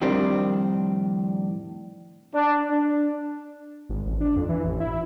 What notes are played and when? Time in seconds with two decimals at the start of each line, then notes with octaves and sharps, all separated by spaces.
0.01 F2 A2 D#3 G3 C4 D4
2.34 D4
2.70 D4
3.89 G#1
4.06 A1
4.21 D4
4.36 F2
4.49 E3
4.65 A1
4.80 E4